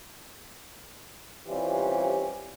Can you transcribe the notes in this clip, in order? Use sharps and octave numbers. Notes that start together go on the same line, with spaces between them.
E3 G3 C4 C#4 F4 G4